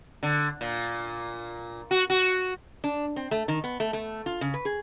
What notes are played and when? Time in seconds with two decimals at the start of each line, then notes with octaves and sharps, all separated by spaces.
0.23 D3
0.61 A#2
1.91 F#4
2.10 F#4
2.84 D4
3.16 C4
3.31 A3
3.48 D#3
3.64 B3
3.80 A3
3.93 A3
4.26 F4
4.41 C#3
4.54 B4
4.65 G#4